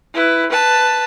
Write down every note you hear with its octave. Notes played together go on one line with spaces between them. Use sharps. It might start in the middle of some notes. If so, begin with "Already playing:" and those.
E4 B4
B4 A5